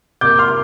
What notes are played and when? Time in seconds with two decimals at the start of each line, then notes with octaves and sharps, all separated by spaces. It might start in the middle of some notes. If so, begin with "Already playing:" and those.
0.21 C3 A#3 D6 G6
0.39 C6 F6